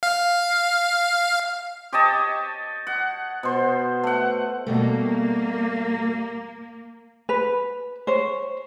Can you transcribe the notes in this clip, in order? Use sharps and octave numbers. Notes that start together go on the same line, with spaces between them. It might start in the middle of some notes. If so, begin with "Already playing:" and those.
F5
G4 C#5 D#5 A5
F#5
B2 C5
A3 F#5
B2 G3 A3 A#3
B4
C5 C#5